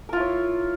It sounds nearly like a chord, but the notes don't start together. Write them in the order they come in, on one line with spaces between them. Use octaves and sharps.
A#4 F4 E4 C#5